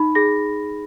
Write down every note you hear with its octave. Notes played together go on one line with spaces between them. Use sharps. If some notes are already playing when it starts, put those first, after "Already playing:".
Already playing: D#4 B5
G#4 A#6